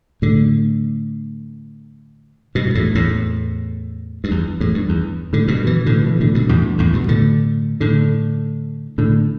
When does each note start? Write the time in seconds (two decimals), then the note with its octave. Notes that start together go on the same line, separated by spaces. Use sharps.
0.22 A2 D3
2.55 G2 B2
2.68 G2
2.75 E2 A2
2.95 E2 A2
4.24 G2
4.31 E2
4.60 E2 A2
4.74 G2
4.89 E2
5.33 A2 D3
5.48 G2 B2
5.67 B2 E3
5.86 A2 D3
6.06 B2 E3
6.20 A2 D3
6.35 G2 B2
6.49 E2 A2
6.64 G2
6.78 E2 A2
6.93 G2 B2
7.08 A2 D3
7.81 A2 D3
8.98 A2 D3